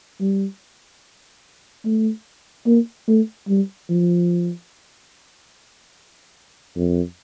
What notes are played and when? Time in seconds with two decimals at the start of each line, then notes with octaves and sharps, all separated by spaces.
0.21 G3
1.85 A3
2.66 A#3
3.08 A3
3.49 G3
3.90 F3
6.76 F2